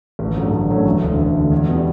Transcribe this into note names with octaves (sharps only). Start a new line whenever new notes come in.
A1
G2 F#3 A3 C#4
A1
G2 F#3 A3 C#4
E1
D2 D3
E1
D2 D3
E2
B2 G3